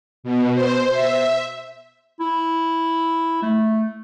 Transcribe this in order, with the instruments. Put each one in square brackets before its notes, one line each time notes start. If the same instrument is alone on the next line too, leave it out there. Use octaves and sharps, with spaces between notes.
[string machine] B2
C5
E5
[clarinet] E4
A3